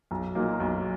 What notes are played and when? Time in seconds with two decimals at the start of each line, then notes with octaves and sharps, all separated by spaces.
0.11 B1
0.35 A#2 F#3 A#3 D#4
0.60 B1